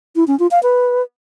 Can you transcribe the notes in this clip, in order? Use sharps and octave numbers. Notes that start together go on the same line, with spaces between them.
E4
C#4
F4
F5
B4